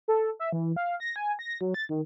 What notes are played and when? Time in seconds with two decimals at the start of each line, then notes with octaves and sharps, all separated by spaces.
0.08 A4
0.40 E5
0.53 E3
0.76 F5
1.00 A#6
1.16 G#5
1.39 A#6
1.61 F#3
1.74 A6
1.89 D#3